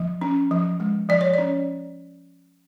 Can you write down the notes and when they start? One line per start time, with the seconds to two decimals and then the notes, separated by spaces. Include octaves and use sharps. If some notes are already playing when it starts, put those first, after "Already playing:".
Already playing: F3
0.21 C#4
0.51 F3
0.80 G#3
1.09 F3 D5
1.21 C#5
1.34 C#4 D5